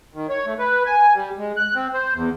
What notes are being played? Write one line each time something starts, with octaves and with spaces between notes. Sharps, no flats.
D#3
C#5
A3
B4
G#5
G3
G#3
F#6
C4
C5
E2